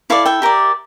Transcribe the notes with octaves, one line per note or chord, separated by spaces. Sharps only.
E4 A4 D5 F5
E5 G5
G4 A#4 D5